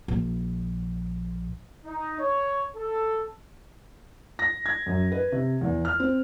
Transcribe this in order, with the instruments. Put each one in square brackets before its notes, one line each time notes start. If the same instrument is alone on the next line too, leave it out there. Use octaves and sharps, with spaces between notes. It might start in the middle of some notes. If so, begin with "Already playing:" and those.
[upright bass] A#1
[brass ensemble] D#4
C#5
A4
[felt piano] A#6
G#6
F#2
B4
C3
E2
F6
C4